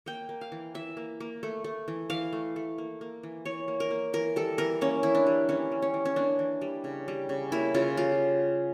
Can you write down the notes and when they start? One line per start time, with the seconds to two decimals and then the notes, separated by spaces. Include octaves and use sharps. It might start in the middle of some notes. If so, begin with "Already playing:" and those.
0.06 A#3 G5
0.29 A#3
0.41 F5
0.52 E3
0.75 E3 E5
0.97 A#3
1.20 A#3
1.43 A3
1.64 A3
1.88 E3
2.10 E3 F5
2.33 A3
2.56 A3
2.78 A#3
3.01 A#3
3.23 E3
3.45 E3 C#5
3.68 A#3
3.80 A#4
3.91 A#3
4.13 E3 A#4
4.36 G3 A4
4.58 E3 A#4
4.81 A#3 C#4
5.03 E3 E4
5.15 D4
5.27 G3
5.49 E3 C#4
5.72 G3
5.82 C#4
5.94 E3
6.05 C#4
6.16 A#3 D4
6.39 E3
6.61 G3
6.84 C#3
7.08 G3
7.29 C#3
7.52 A#3 E4
7.74 C#3 F4
7.97 G3 F4